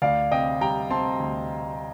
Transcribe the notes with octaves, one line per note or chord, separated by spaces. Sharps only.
D2 D5 F5
C3 D#5 G5
G3 G5 A#5
C4 A5 C6
D2